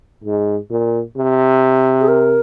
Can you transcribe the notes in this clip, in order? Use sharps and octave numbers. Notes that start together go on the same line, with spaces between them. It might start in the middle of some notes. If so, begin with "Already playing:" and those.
G#2
A#2
C3
G#4
A#4